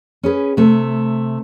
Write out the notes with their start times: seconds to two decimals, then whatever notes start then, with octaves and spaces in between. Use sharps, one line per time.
0.23 C#4 G#4 B4
0.57 C3 A3